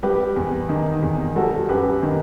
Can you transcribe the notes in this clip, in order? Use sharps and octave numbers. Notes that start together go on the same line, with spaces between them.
G3 G4 B4
E2
D#3
E2
G3 F#4 A4
F#2 G4 B4
D#3